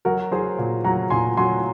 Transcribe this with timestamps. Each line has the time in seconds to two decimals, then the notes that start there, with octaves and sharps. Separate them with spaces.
0.05 F#3 F#4 A#4
0.31 F#3 G#4 C5
0.58 A#2
0.84 F#3 F#5 A#5
1.10 A#2 G#5 C6
1.37 F#3 G#5 C6